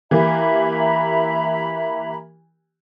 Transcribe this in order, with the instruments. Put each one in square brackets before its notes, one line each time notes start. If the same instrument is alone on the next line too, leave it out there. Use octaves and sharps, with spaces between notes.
[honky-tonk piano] E3 A#3 G4 [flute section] E5 A#5 B5